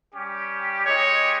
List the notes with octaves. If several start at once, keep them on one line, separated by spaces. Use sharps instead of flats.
G3 C#4 G4
G#3 D#4 G4 C#5